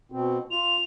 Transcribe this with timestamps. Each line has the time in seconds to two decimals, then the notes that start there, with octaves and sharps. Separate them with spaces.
0.12 B2 C4
0.51 F4 F7